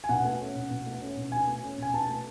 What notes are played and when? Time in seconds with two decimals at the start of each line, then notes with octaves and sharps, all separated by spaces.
0.04 G#5
0.09 B2 F#5
0.25 A3
0.40 C#4
0.55 B2
0.70 B2
0.86 A3
1.02 C#4
1.17 B2
1.32 B2 G#5
1.47 A3
1.63 C#4
1.78 B2 G#5
1.94 B2 A5
2.09 A3